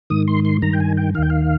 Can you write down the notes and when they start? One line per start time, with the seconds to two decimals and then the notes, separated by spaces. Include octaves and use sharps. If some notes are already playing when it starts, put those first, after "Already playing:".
0.10 G#2 D#3 D#6
0.28 C6
0.45 C6
0.62 G2 D#3 A#5
0.73 G5
0.80 G#5
0.97 G5
1.15 D#3 F5
1.19 D#2 G5
1.30 F5